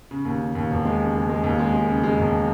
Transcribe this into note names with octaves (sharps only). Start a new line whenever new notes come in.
C#3
D#2
C#3
D#2
E1
G#3
C#3
G#3
G#3
D#2
G#3
G#3
C#3
G#3
E1